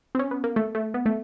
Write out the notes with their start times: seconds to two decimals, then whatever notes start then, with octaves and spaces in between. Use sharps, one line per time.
0.15 C4
0.19 C#4
0.31 B3
0.44 A#3
0.56 A3
0.75 A3
0.94 B3
1.06 A3